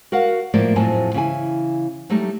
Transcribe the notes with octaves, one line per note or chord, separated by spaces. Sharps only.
F#4 A#4 F5 F#5
A2 F3 A3 A#3 D5
F2 A2 F3 F#3 G#5 A5
C#3 E3 E4 G#5
F#3 G3 A3 D#4